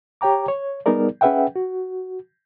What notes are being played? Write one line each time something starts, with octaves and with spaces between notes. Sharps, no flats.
G4 C#5 G5 A#5 D6
C#5
G3 B3 D#4 G#4 A#4 D5
C#4 G#4 B4 E5 F#5 G5
F#4